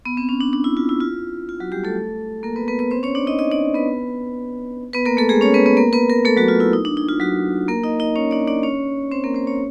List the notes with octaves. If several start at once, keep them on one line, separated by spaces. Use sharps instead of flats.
B3
C4
C#4
D4
D4
E4
F4
E4
F4
F4
F#3 F#4
G3 G4
A3 A4
A#3 A#4
B3 B4
B3 B4
B3 B4
C4 C5
C#4 C#5
D4 D5
D#4 D#5
D#4 D#5
D4 D5
B3 B4
B3 B4
A#3 A#4
A3 A4
G#3 G#4
C#4 C#5
B3 B4
B3 B4
A#3 A#4
B3 B4
A#3 A#4
A3 A4
F#3 F#4
F4
E4
D#4
D4
D#4
F4
F#3 F#4
A#3 A#4
D#4 D#5
D#4 D#5
C#4 C#5
D4 D5
D4 D5
C#4 C#5
C4 C5
A#3 A#4
C4 C5
C#4 C#5